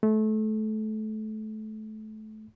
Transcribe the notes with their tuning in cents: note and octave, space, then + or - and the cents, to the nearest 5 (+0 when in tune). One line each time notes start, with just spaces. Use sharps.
A3 -25